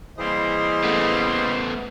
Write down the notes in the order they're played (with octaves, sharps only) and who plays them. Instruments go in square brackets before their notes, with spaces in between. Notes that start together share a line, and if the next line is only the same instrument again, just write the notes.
[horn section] E3 G#4 D#5 [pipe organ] G3 A#3 C4 [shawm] C5
[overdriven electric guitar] A3 B3